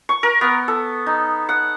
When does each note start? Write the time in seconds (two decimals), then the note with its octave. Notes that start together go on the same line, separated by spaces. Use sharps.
0.09 C#6
0.23 A#4
0.41 B3
0.68 A4
1.06 D#4
1.49 F#5